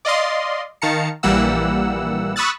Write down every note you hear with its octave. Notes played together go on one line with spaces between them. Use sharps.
D5 D#5 F5 C6
D#3 F5 A5 A#5 C#7
A#1 E3 G3 A#3 F#5 E6
B5 C#6 D#6 E6 F#6 A6